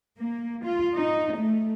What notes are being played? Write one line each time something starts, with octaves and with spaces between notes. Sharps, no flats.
A#3
F4
D#4
A3